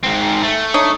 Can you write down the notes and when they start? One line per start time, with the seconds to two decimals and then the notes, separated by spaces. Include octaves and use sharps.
0.03 G#2 C4
0.43 A3
0.74 D4 D#4 C#5